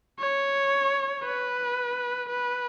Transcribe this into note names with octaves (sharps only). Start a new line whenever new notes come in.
C#5
B4
B4